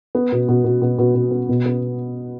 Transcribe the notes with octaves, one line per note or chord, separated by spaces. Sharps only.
B3
B2
B2
B2
B2
B2
B2
B3
B2
B3